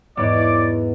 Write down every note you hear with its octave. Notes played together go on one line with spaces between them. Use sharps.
E2 G#2 B3 C#5 D5 D6